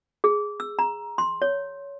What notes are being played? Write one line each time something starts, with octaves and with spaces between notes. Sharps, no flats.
G#4
E6
A#5
C6
C#5